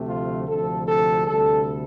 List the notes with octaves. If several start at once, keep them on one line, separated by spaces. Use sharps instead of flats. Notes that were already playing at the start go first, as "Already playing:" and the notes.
Already playing: D2 C3 F3 A3
F4
D2 C3 F3 A4
A4
D2 C3 G3 A4